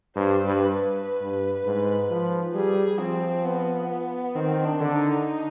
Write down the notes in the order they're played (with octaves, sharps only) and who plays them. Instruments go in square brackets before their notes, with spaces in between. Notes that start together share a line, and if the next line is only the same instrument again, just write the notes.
[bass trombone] G2 [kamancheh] C5
[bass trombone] G2 [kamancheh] B4
[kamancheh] B4
[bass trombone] G2
G#2
F3
[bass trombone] G3 [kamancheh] G#4
[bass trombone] F3 [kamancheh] C4
[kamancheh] B3
B3
[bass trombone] D#3 [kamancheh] C4
[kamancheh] D4
[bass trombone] D3
[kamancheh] D#4